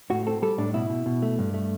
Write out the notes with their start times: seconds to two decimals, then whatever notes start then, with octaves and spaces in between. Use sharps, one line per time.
0.10 A2 F#4
0.27 C4 A4
0.42 G3 A4
0.58 A2 D4
0.74 B2 E4
0.90 B2
1.06 B2
1.22 A3
1.39 G2
1.54 A3